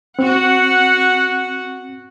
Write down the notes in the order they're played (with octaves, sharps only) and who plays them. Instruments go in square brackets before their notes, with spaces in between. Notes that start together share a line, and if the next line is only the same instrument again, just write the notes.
[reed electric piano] C4 [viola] F#4 F#5